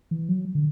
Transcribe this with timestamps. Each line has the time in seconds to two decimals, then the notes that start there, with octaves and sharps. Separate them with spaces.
0.11 E3
0.29 F#3
0.55 D3